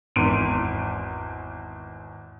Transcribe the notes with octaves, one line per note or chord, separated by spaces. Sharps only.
G#1 E2 C6 D7 D#7